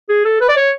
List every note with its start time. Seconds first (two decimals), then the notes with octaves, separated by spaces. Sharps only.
0.09 G#4
0.25 A4
0.41 B4
0.49 D5
0.56 C#5